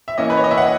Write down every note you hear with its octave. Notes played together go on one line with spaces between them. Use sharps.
E5
E3 A#3 C#4 D#5
B4
C#5
D#5
E5
F#5